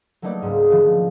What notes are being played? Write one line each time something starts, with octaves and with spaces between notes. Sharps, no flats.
F#3 A3 A#3 D#4 B4 D5
C#2 G#2
D3 D#3 F3